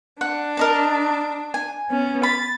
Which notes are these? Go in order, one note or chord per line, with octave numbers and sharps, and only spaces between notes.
D4 F#5
A#4 D#5 A5
G#5
B3 C#4
B5 A6